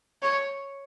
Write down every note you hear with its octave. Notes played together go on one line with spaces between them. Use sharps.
C#5